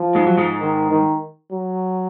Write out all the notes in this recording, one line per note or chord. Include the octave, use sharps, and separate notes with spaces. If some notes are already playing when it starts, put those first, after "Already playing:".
Already playing: F3
G#2 G#3
F#3
G#2 G#3
D#3
D#3
F#3